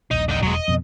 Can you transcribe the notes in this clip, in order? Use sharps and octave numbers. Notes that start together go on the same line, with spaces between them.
D#1 A#1 D#4
D3 D#4
E1 F#3 G#3
D#5
F2 B2